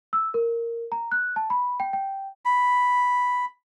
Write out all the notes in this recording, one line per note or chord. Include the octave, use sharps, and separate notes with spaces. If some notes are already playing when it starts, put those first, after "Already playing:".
E6
A#4
A#5
F#6
A5
B5
G5
G5
B5